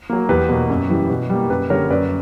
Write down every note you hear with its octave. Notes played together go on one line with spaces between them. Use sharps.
F#3 A#3
E2 G4 B4
B2 A#3
F#2
E3 G3
B2
G3 A#3
F#2 G4 B4
D3 G3 A#3 A#4 C#5
F#2 B4 D5